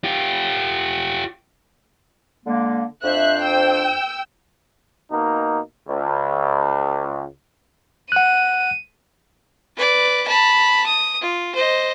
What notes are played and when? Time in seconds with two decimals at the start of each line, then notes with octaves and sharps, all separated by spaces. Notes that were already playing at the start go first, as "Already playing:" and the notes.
0.04 F4 G4
2.45 D3 G#3 A#3
3.04 F2 D4 C5 E5 F#6
3.41 G5 E6
5.11 B2 A#3 D#4
5.88 C#2
8.12 F#5 F#6 D#7
9.76 B4 D5
10.27 A5 B5
10.86 D#6
11.21 F4
11.55 C5 D#5